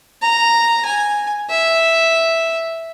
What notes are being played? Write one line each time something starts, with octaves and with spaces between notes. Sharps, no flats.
A#5
G#5
E5